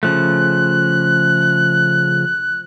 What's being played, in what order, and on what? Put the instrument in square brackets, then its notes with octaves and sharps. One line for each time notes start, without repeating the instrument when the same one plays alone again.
[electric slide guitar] C#3 F3 A3 [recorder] F#6